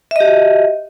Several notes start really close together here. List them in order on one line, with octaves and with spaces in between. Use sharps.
E5 D#5 G4 F#4